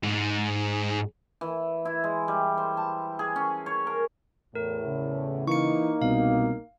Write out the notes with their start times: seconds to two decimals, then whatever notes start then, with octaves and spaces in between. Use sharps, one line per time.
0.03 G#2
1.41 E3
1.85 E4
2.04 G#3
2.28 G3
2.58 C5
2.77 A5
3.19 G#4
3.36 C#4
3.66 C#5
3.87 A#4
4.55 E2 A2 A#4
4.86 C#3
5.48 E3 A#3 D#4 C#6 C#7
6.02 C2 B2 F5